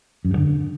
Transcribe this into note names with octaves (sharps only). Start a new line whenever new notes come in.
F#2
G2
D3